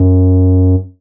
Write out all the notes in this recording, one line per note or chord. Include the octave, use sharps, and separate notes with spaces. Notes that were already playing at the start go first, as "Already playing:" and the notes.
Already playing: F#2